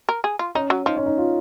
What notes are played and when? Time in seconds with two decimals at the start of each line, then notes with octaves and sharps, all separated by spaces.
0.09 A#4
0.24 G#4
0.39 F4
0.55 C#4 D#4
0.70 F#3
0.86 F3 D#4
0.97 C#4
1.06 D#4
1.18 F4